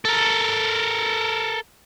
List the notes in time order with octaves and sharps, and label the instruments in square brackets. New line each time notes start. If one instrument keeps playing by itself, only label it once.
[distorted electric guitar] A4 A#4